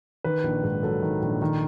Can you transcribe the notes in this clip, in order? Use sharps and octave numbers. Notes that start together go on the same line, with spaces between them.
D#3 B4
A#1
G#2
F#3 A4
D#3
A#1
D#3